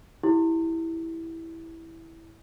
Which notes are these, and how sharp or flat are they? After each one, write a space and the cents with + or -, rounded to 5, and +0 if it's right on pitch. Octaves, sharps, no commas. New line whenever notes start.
E4 -5 G4 +0